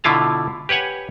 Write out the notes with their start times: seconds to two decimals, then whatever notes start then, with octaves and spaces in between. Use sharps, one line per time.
0.04 B2 D3 E4 F4 A5 A#5
0.69 G4 B4 C#5 F#5 G#5